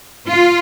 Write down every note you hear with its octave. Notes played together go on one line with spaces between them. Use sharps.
F4